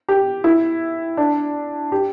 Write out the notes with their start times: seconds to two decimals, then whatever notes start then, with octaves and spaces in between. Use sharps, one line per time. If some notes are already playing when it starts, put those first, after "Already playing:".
0.09 G4
0.44 E4
1.17 D4
1.92 G4